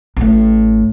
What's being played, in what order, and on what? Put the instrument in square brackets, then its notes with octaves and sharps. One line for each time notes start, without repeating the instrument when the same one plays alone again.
[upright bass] A1 A2